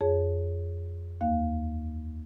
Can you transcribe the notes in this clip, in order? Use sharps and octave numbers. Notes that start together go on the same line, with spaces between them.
F2 G#4 C#5
D#2 A#3 F5